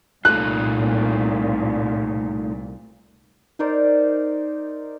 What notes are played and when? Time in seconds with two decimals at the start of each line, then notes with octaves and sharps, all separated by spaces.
0.25 C2 A#2 A3 D#4 F4 F#6
3.59 D#4 A#4 C5 D5